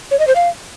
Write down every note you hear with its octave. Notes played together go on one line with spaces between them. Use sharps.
C#5
D#5
C5
F5